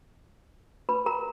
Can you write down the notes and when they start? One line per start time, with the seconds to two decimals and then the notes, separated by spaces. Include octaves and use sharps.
0.89 B4 B5
1.06 A#4 A#5